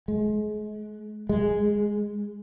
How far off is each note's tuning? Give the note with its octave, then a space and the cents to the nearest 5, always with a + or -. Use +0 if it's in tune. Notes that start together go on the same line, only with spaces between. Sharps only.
G#3 +35
G#3 -5